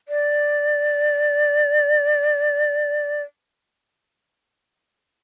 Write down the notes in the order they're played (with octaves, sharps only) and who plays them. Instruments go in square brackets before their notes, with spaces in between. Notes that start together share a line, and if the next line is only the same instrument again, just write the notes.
[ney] D5